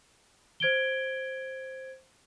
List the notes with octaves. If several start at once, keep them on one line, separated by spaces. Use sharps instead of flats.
C5 G#6 D7 G7